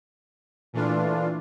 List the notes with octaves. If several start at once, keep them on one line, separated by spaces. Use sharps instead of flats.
A#2 E3 A3 D4 F4